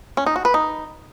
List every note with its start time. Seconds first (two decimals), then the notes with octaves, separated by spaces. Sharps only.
0.17 C#4
0.26 D#4
0.36 F#4
0.45 B4
0.54 D#4